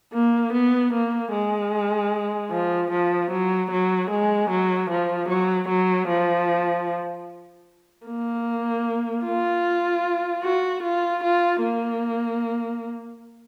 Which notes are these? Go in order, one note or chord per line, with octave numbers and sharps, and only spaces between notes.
A#3
B3
A#3
G#3
F3
F3
F#3
F#3
G#3
F#3
F3
F#3
F#3
F3
A#3
F4
F#4
F4
F4
A#3